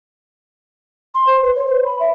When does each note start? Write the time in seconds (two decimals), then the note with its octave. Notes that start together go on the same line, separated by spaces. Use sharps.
1.14 C6
1.27 C5
1.42 B4
1.55 C#5
1.67 C5
1.85 B5
2.00 E5